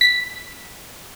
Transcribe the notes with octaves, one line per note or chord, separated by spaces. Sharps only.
B6